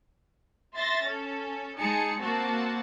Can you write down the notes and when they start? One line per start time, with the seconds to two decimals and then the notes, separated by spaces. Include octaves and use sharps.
0.75 E5 C6 A6 A#6
1.05 C#4 A4
1.78 G#3 D#4 G#4 A5 C#7
2.20 A#3 C4 F#4 A5